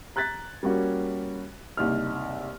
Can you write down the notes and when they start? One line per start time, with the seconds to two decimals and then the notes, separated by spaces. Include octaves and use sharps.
0.16 A#5 F#6 G#6 A6 B6
0.63 G3 A#3 C#4 F#4
1.77 F#1 C2 D#4 F6